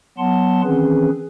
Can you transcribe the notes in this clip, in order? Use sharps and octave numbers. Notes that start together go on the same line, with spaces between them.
F#3 B3 F#5 A5 C6
D#3 E3 C4 C#4 G#4 B4